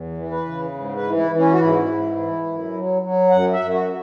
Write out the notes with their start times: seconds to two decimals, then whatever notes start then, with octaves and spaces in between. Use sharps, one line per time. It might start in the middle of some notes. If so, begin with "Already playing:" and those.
Already playing: E2
0.17 E3
0.31 B4
0.45 C#3
0.74 G#2
0.95 B4
1.03 E3
1.16 E4
1.31 E3
1.38 C#4
1.52 F#4
1.59 G#2 E4
1.88 G#2
2.16 E3
2.45 F#2
2.73 F#3
3.02 F#3
3.31 F#2 F#5
3.52 E5
3.59 F#2
3.73 F#4
3.88 F#3